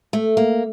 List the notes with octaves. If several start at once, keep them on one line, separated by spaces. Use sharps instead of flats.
A3
A#3